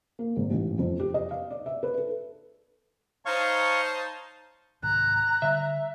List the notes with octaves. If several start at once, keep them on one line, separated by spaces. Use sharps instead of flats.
A#3
G#1
A1
F2
G4
D#5
F5
D5
E5
B4
A4
D#4 C5 C#5 F5 A5 C#6
C2 G#2 D#3 A#5 F#6
D3 G3 E5